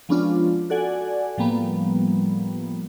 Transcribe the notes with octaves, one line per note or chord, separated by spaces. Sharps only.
F3 G#3 B3 C#4 D4 F4
F#4 A4 D5 F#5 G#5
A2 F3 G3 A#3 B3